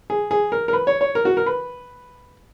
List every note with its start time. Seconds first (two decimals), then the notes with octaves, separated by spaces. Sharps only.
0.10 G#4
0.31 G#4
0.52 A#4
0.68 A#4
0.73 B4
0.87 C#5
1.01 C#5
1.15 A#4
1.25 F#4
1.37 A#4
1.46 B4